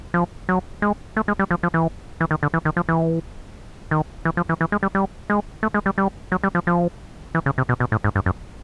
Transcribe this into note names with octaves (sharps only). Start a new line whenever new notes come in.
F3
F#3
G#3
A3
G#3
G3
F3
F3
E3
E3
D#3
D3
E3
D#3
F3
E3
D#3
E3
F3
E3
E3
G#3
G3
G3
G#3
A3
G#3
G3
G3
F#3
G3
F3
F3
E3
C#3
C3
B2
B2
A2
G#2
G2
F#2